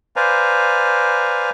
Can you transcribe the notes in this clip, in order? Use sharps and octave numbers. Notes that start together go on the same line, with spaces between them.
B4 C5 D5 F5 G#5 A#5